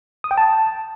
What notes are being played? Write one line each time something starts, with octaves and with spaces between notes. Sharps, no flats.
D#6
G5
A5